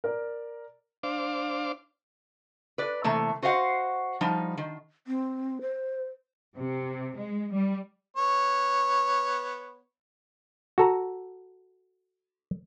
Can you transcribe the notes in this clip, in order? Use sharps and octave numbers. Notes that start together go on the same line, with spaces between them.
A#4 D5
D4 C5 F5 D6
B4 D5
C3 E3 A3 A#3
F#4 C5 D#5 F5 F#5
F3 G3 D#4
D#3
C4
C5
C3
G#3
G3
B3 C#5
F#4 A4 A#5